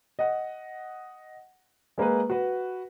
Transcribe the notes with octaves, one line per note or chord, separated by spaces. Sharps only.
D#5 F#5
G#3 A#3 G#4 B4
F#4 B4